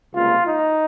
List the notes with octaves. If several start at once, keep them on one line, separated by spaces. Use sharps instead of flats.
C#2 C3 G3 A#3 F4
D#4